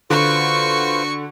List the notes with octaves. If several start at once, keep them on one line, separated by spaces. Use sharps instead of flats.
D3 F4 F#4 B4 C5 C#6